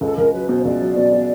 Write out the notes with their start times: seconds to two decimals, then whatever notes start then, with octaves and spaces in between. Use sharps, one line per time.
0.01 C#2 A4
0.17 C#2 A#4
0.33 F#3 B4
0.49 B2 C5
0.65 C#2 D5
0.81 F#3
0.97 B2
1.13 B2